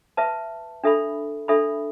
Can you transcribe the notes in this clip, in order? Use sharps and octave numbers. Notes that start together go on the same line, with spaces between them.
B4 E5 A5
D4 A4 E5 B5
D4 A4 E5 B5